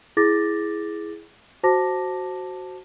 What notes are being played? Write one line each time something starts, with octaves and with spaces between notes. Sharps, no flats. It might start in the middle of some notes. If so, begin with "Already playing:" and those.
E4 G#4 D6 A6 A#6
F#4 C5 A5 D6 A#6